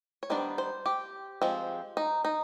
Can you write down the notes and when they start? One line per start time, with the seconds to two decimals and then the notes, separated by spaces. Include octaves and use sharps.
0.23 C#5
0.30 D#3 G3 B3 D4 C5
0.58 C5
0.86 G4
1.42 F3 G#3 C4
1.97 D#4
2.25 D#4